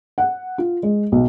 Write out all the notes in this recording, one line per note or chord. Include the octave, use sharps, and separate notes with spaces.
F#5
F4
G#3
B1